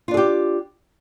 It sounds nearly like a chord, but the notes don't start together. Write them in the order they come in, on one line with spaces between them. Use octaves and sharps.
F4 D4 G#4 G4